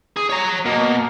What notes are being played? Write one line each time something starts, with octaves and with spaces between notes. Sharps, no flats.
G#4
C#5 A#5
B2 A#3